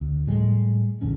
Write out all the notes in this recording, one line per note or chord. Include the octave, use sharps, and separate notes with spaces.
D2
A2 F3 G3 G#3
A#1 E2 D3 C#4